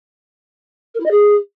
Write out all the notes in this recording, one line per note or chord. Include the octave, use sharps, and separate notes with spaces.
A#4
E4
D#5
G#4